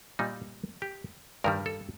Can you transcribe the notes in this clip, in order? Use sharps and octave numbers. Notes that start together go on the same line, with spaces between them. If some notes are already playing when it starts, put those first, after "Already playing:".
A#2 G3 D#4
G4
G2 D#3 G3 A#4
A4